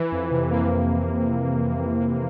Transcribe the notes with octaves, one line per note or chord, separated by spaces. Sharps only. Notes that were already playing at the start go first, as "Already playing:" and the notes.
Already playing: E3
F2
C3
A#3
E3
F2